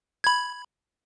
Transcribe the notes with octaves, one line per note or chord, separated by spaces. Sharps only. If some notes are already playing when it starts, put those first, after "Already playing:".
B5 G#6